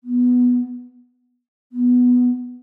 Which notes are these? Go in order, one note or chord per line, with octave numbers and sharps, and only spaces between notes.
B3
B3